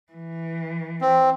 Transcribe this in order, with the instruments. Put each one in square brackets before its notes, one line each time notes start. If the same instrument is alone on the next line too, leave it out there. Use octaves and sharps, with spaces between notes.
[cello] E3
[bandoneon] C4